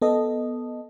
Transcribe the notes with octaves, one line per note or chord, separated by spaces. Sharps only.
B3 A4 D#5